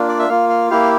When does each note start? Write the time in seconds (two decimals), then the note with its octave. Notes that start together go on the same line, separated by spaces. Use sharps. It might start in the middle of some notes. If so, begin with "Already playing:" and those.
Already playing: A#3 D4 F4
0.08 D5
0.19 E5
0.29 A#3 F4 F5
0.49 F5
0.70 A#3 E4 G4 F5